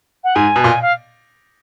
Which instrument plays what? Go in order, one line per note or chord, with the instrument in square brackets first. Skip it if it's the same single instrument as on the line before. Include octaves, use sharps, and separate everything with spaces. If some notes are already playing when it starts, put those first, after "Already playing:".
[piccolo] F#5
[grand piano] G#2 [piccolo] G#5
[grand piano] B2
A#2
[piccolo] F5